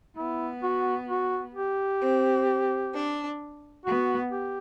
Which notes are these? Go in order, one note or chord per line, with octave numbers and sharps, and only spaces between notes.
B3 E4
F#4
F#4
G4
C4
D4
B3 F#4
G4